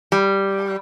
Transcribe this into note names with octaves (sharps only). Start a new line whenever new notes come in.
G3